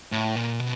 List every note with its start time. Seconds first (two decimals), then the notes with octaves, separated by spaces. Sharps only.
0.12 A2
0.36 A#2
0.60 B2